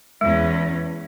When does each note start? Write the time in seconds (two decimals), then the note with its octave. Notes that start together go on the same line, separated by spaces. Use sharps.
0.21 E2 G#3 C#4